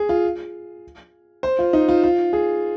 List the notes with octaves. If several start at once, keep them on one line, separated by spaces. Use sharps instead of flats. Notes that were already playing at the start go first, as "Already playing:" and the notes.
Already playing: G#4
F4
C5
F4
D#4
F4
F4
G#4